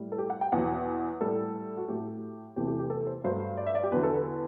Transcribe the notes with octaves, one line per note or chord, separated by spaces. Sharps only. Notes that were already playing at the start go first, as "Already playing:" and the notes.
Already playing: A2 G3
A4
G4
F#5
G5
E2 B2 F#3 F#5
A2 G3 A4
F#4
A2 F#3 A3 G4
E2 C3 E3 A3 G4
G4
G4
A4
C5
G2 F#3 A3 C5
D5
E5
D5
G4
E2 D3 F#3 B4
A4
B4